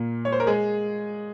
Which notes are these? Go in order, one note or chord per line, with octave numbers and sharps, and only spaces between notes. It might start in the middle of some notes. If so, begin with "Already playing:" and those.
Already playing: A#2 A#3
C#5
C5
A#4
G#3 G#4